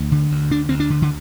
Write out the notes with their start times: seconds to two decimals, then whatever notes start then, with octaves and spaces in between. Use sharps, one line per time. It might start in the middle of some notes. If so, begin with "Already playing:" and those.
Already playing: D2
0.12 D3
0.31 D2
0.51 D3 D4
0.69 D2 C4
0.80 D4
0.90 D3
1.02 D3